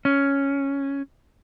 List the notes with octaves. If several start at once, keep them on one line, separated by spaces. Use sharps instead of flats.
C#4